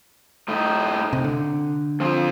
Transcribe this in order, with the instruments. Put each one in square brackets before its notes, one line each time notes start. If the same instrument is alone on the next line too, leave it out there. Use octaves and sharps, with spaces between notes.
[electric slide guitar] A2 A3 D#4
[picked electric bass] C3
D3
[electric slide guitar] F3 C4 F4